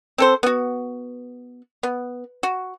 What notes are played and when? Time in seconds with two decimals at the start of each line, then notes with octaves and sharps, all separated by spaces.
0.18 C4 A4 C5
0.43 B3 F#4
1.83 B3
2.43 F#4